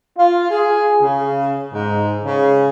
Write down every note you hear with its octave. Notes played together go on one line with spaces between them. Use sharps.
F4
G#4
C#3
G#2
C#3